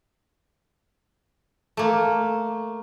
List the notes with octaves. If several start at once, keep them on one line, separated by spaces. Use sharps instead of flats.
A3 A#3